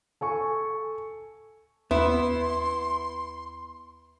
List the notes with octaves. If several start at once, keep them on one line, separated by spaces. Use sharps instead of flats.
A4 G#5 C#6
D#2 B3 E4 C6